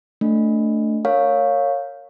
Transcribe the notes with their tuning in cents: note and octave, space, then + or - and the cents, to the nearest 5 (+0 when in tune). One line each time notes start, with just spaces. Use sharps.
A3 +5 D4 -10
A#4 -20 C#5 +0 F5 +10